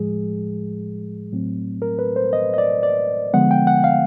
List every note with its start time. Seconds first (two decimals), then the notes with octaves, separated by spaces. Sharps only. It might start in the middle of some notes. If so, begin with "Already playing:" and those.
Already playing: A2 F3 G#3 G#4
1.32 A2 F#3 A3 C4
1.82 A#4
1.99 B4
2.16 C5
2.33 D#5
2.54 D#5
2.58 D5
2.83 D5
3.33 D3 F3 G#3 B3 F#5
3.51 G5
3.67 F#5
3.84 F5